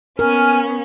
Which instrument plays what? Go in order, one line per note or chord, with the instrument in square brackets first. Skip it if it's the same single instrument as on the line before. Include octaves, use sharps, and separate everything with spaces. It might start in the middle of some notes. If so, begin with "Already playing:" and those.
[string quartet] B3 C#4 [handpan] A#4 [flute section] G#5 F6